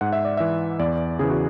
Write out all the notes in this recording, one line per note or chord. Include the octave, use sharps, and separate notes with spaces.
G#2 F#5
E5
D5
E3 E5
E2 D5
C#3 E3 G#4
F#4